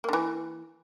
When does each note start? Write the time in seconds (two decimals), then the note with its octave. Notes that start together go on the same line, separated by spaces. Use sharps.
0.04 A#3
0.09 D3
0.13 E3